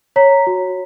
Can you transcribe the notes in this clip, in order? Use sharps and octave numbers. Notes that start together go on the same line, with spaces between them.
C#5 A#5 B6
F#4